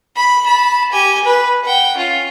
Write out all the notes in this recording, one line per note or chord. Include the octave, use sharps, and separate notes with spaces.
B5
A5 B5
G4 G#5
B4
F#5 G5
C#4 F4